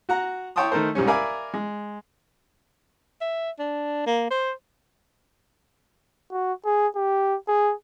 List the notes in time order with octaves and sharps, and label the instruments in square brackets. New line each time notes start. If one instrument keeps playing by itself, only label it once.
[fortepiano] F#4 F#5 A#5
E4 C#5 G5 A5 C6 D#6
D#3 A3 D#4 A4 A#4 C5
C2 G#2 G3 C#4
A#4 D5 E5 F5 G#5 B5
G#3
[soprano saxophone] E5
D4
A#3
C5
[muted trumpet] F#4
G#4
G4
G#4